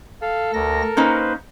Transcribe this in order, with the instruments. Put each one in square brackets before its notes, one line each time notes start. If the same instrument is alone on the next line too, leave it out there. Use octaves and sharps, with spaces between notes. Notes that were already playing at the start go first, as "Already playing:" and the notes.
[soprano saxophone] A4 [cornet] F5
[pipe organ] D2 A#6 [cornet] A#4
[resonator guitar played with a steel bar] A#3 C#4 D#4 [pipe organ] B4 C5